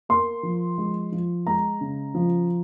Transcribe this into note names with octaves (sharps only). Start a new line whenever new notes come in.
A#3 C6
F3
G#3
F3
G#3 A#5
C#3
F3